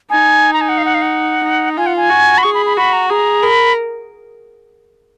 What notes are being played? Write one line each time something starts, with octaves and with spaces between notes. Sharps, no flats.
D#4 G#5
A#5
G#5
F#5
F5
F#5
F5
F#5
D#4
F4 G#5
F#5
G#5
F#4
B5
G#4 C#6
B5
B5
F#4 B5
A#5
G#4 A#5
A#4 B5